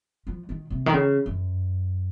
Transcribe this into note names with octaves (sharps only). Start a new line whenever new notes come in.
F3
D#3
C3
D#3
C#3
F#2